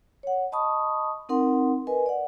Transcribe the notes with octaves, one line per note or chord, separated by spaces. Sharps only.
C#5 F#5
D#5 A5 B5 C#6 D#6
C4 D#4 A#4 F#5 C6
A#4 B4 D#5 G#5
D5 F#5